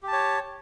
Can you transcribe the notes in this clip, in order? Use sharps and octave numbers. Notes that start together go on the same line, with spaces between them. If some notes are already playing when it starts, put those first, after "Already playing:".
G4 C#5 A5